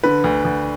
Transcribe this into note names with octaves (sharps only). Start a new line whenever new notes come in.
D3 B4
D2
D2